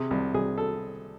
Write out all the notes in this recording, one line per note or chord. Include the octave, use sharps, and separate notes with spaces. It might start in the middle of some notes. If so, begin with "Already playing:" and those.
Already playing: C3 G#4
C2
C2 G#4
A4